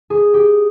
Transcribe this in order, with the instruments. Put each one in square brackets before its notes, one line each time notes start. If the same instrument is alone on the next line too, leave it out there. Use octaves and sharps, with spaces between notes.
[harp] G#4
G4